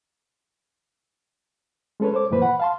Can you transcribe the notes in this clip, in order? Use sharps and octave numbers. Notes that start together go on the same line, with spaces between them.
G#3 C#4 A4 B4 C#5
A4 C5 C#5 D6
F#2 A#2 E3 A#3 B4 C5
F#5 B5
F5 A5 C6